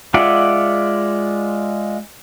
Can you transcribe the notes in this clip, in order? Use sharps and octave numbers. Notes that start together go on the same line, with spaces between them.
G#3 F4 D5 E5 F#5